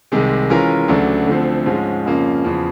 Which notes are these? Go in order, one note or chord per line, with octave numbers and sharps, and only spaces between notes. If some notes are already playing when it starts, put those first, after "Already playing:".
C2 C3 D#3 G#3
E3 G#3 C#4 F4 A#4
D2 C#3 F#3 A3 D4
D2 D3 F3 A3 C4
G#2 F3 G#3 C#4
F2 C#3 F3 A#3 C#4
E2 C#3 F3